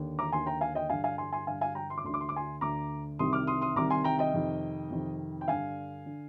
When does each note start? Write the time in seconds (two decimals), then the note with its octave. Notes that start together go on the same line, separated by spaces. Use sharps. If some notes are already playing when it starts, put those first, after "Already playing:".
Already playing: D#2 D3
0.19 A#5 D6
0.32 D#2 D3 G#5 C6
0.46 G5 A#5
0.61 F5 G#5
0.75 D#5 G5
0.90 G2 D3 F5 G#5
1.04 F5 G#5
1.18 G#5 C6
1.32 G#5 C6
1.47 G2 D3 F5 G#5
1.61 F5 G#5
1.75 G5 A#5
1.90 C6
1.98 D6
2.04 D2 C6
2.09 D3 D6
2.21 C6
2.29 D6
2.36 G#5 C6
2.61 D2 D3 A#5 D6
3.19 C2 C3 D#3 C6 D#6
3.33 D6 F6
3.47 C6 D#6
3.61 C6 D#6
3.76 C2 C3 D#3 A#5 D6
3.90 G#5 C6
4.04 G5 A#5
4.19 D#5 G5
4.34 F2 C3 D#3
4.90 F2 C3 D#3
5.41 G5
5.48 G2 D3 F5 G#5
6.06 D3